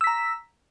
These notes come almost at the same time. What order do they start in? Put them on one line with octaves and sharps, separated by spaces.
E6 B6 A#5